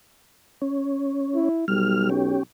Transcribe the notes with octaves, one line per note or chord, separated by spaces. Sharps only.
C#4
E4
B1 G3 F6
C#4 G4